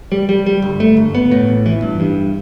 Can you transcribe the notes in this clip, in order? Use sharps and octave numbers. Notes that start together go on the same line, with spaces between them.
G3
G3
G3
G1
A3
G1
B3
A2
A1
E3
G2
G2